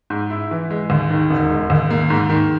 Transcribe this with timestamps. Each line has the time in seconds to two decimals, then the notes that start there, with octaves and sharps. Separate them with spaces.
0.10 G#2
0.30 E4
0.51 E3
0.70 G#3
0.90 D#2
1.10 D#3
1.30 E1
1.50 G#3
1.70 D#2
1.90 A#3
2.10 G#2
2.30 D#3